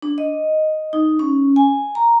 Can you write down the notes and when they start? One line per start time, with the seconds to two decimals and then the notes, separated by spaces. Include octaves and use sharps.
0.02 D4
0.18 D#5
0.93 D#4
1.19 C#4
1.56 G#5
1.95 A#5